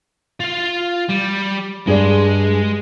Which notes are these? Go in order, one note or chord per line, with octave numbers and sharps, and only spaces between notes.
F4 F5
G3
G2 G#3 G#4 D5